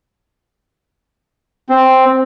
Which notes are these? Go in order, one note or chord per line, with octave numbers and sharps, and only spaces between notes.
C4